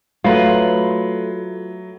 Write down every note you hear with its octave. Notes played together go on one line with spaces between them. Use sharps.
F#3 A3 F4 B4